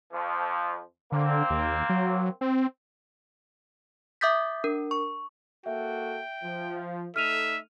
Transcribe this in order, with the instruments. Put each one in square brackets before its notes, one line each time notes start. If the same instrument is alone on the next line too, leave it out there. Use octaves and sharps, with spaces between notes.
[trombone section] F2 F3
[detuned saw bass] D3 [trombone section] A#3 C4
[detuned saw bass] D#2
F#3
C4
[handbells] E5 D6 D#6 G6 A6 B6
D4 A#4
C#6
[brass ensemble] A#3 F#4 A4 [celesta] E5 [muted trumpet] G5
[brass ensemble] F3
[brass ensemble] A3 D#4 A4 [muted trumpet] E5 [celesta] F6 D#7 F7